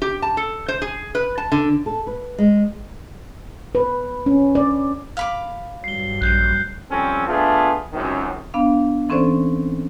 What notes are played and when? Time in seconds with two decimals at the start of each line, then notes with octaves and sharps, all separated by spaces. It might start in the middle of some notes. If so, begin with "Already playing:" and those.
0.02 G4
0.22 A5
0.37 A4
0.68 C5
0.82 G#4
1.15 B4
1.38 A5
1.52 D3
1.86 A4
2.07 B4
2.38 G#3
3.75 B4
4.26 C#4
4.55 D5
5.17 F5 B5 D6
5.84 G2 F#3 G3 C7 G7
6.21 A#1 F#6 G6 C7
6.90 F3 G3 C4 C#4 A4
7.27 A3 B3 D4 F4 G#4
7.93 C#2 F#2 C3 D#3 F#3
8.54 B3 D4 F5
9.09 E3 C4 C#4 A4 C5 D5